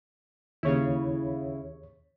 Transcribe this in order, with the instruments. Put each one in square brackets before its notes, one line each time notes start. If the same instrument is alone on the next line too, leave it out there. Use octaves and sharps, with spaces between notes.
[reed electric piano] D#2 C#5 [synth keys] C#3 E4